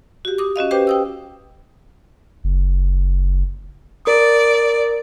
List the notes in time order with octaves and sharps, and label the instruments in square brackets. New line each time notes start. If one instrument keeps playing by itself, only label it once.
[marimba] F#4 G4
D6 D#6
C#4 F#4 D#5 F5
G4 B4 C5 G5 D6 G6
G5 D#6 E6
[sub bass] F#1
[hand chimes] A#4 D#6 [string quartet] D5